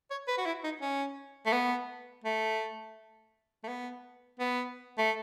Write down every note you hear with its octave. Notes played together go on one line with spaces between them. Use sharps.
C#5
B4
F#4
E4
D#4
C#4
A3
B3
A3
A3
B3
B3
A3